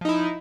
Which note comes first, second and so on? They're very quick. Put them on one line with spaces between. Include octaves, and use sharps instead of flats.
F3 D#4 E4